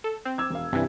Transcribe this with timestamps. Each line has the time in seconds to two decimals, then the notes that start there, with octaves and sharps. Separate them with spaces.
0.04 A4
0.25 C4
0.38 D6 E6 G#6
0.50 E1 F5
0.72 G2 C3 E3